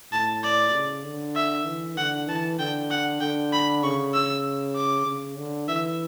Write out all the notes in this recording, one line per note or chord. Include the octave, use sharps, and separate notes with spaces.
A2 A5
D5
C#3
D3
E5
E3
D3 F#5
E3 A5
D3 G5
F#5
D3 G5
B5
C#3 C#6
E6
D6
C#3
D3
E3 E5